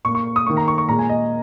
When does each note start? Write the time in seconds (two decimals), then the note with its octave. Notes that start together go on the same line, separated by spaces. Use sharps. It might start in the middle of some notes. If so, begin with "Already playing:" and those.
0.05 A#2 C#6
0.08 A#3
0.15 C#6
0.36 D#6
0.46 D#3 A#3 C#6
0.57 A#5
0.68 C#6
0.78 C#6
0.89 A#2 G#3 A#5
0.99 G#5
1.09 D#5